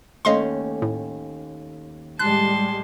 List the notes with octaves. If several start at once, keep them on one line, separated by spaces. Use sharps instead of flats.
D#2 A3 C#4 D#5 F5 C6
A2
A2 G3 G#3 A5 C6 F#6